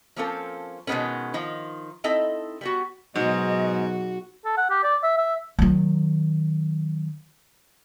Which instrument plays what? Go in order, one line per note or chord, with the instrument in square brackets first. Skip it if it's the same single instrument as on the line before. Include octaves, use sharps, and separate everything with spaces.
[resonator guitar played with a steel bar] F3 A#3 C4 C#4 F4 A4
B2 D#3 E3 G#3 B3 C#4
D#3 F3 D#4
C4 D#4 E4 A4 D#5
G3 B3 F#4
[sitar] G#2 [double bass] B2 F#3 [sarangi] F#4 [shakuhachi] D#5
[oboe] A4
F#5
G4
D5
E5
E5
[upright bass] D#3 F#3